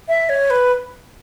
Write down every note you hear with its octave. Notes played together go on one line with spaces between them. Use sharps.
E5
C#5
B4